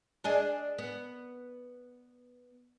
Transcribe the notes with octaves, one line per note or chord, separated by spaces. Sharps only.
D4 G#4 D#5
B3